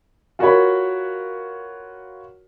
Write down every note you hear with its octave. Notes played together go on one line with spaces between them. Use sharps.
F4 F#4 A#4 C#5 B5